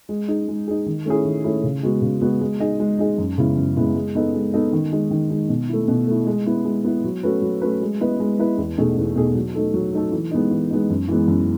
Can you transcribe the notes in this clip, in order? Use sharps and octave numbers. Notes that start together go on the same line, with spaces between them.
G#3
D#4 G#4
G#3
D#4 G#4
D#3
A3 C#4 E4 G#4
D#3
A3 C#4 E4 G#4
C#3
G#3 B3 F#4
C#3
G#3 B3 F#4
G#3
D#4 G#4 D#5
G#3
D#4 G#4 D#5
F#2
C#3 G#3 B3 E4
F#2
C#3 G#3 B3 E4
G#3
B3 D#4 A4 D#5
G#3
B3 D#4 A4 D#5
D#3
G#3 D#4
D#3
G#3 D#4
B2
A3 E4
B2
A3 E4
G#3
B3 E4
G#3
B3 E4
F#3
A3 C#4 F#4 B4
F#3
A3 C#4 F#4 B4
G#3
B3 E4 B4 D#5
G#3
B3 E4 B4 D#5
E2
B2 A3 D#4 G#4
E2
B2 A3 D#4 G#4
F#3
A3 D#4 A4
F#3
A3 D#4 A4
E3
G#3 B3 D#4
E3
G#3 B3 D#4
F#2
E3 G#3 B3
F#2